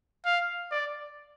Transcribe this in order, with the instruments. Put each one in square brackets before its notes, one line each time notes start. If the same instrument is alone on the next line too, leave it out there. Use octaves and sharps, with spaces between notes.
[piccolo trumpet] F5
D5